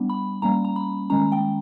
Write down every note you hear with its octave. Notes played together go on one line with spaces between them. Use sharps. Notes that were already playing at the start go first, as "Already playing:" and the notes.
Already playing: G3 B3 D4
B5
G3 A#3 C#4 A#5
A#5
B5
D#3 G#3 C#4 A#5
G5